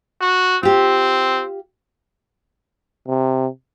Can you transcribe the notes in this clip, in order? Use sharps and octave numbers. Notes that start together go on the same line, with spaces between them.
F#4
C4 F4 G4
C3